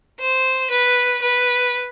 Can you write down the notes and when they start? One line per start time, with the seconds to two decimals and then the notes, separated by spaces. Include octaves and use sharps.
0.20 C5
0.70 B4
1.22 B4